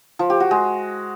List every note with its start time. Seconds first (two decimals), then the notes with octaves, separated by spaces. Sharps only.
0.19 F3
0.30 G4
0.40 F#4
0.51 G#3